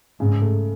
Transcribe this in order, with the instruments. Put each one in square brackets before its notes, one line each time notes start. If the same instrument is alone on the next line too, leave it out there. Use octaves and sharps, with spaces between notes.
[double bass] G#2 [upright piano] C#3
[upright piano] A3